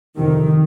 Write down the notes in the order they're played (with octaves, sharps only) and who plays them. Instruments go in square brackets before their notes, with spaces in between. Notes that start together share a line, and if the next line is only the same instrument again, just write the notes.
[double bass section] F2 C3 D#3